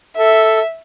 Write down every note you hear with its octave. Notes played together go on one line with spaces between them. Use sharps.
A4 E5